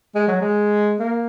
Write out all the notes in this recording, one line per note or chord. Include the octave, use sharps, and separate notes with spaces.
G#3
F#3
G#3
A#3